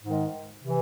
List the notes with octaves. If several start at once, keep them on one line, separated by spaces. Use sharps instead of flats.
G#2 D#3 G#3
C3 E3